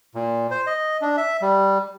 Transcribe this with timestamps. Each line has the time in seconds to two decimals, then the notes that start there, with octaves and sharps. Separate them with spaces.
0.15 A#2
0.51 C5
0.67 D#5
1.01 D4
1.17 E5
1.42 G3